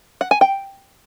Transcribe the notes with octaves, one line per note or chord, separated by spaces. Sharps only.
F#5
G#5
G5